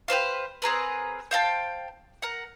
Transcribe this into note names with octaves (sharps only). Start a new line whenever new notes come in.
G4 B4 C5 F5
C4 G#4 A#4 B4
C5 F5 G5 A5
A#4 F#5